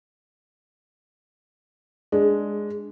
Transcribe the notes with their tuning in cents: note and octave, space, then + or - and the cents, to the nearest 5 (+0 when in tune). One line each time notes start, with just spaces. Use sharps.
G#3 +0 D4 +0